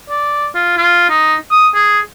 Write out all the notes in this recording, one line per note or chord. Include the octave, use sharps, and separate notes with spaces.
D5
F4
F4
D#4
D#6
G#4